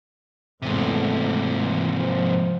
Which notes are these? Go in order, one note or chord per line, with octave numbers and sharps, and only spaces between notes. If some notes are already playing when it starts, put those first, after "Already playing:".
E2 G#2 C3 A3
E3
F3